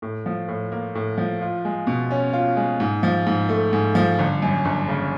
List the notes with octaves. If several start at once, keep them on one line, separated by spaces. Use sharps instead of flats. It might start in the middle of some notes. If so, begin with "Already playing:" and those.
A2
F3
A2
A#3
A2
F3
F4
G#3
B2
C#4
F4
G#3
G#2
F3
G#2
A3
G#2
F3
G1
F#2
G1
C#3